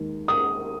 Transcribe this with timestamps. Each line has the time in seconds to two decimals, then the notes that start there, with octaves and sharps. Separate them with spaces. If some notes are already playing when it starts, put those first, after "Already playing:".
Already playing: D#2 D#3 G#3 D#4
0.28 D#6